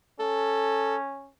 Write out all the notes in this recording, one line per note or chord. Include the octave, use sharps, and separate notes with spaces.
C#4 A4